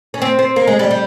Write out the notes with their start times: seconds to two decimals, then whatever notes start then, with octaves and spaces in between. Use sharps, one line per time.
0.14 C#4
0.22 C4
0.39 C4
0.56 A#3
0.68 G#3
0.79 G3
0.91 G3